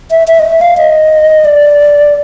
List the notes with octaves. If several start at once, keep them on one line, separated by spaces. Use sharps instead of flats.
E5
E5
D#5
E5
F5
D#5
D5